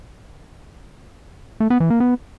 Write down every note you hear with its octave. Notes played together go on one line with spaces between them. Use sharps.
A3
B3
E3
A#3
B3